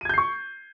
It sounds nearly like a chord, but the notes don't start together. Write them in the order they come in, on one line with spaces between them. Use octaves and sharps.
D#7 G#6 G6 C7 C#6